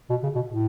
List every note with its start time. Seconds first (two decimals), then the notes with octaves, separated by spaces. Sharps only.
0.10 B2
0.23 C#3
0.35 B2
0.49 A2